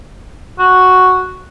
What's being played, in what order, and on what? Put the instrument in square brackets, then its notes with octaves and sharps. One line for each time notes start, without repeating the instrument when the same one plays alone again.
[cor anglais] F#4